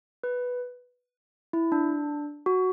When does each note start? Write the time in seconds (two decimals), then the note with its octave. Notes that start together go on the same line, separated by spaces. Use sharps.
0.24 B4
1.53 E4
1.72 D4
2.46 F#4